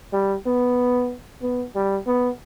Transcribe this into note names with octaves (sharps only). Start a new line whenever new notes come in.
G3
B3
B3
G3
B3